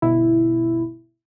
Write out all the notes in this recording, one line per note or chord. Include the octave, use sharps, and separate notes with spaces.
G1 B2 E4